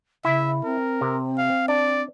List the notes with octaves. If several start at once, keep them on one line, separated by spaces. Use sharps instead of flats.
C#3 E4 E5
C4 A#4
C3
F5
D4 D5